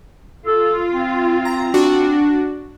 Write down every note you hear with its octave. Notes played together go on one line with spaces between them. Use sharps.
F4 A4
C4
A#5
D4 F#4